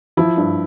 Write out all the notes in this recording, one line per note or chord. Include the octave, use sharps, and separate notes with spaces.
F3 E4
G2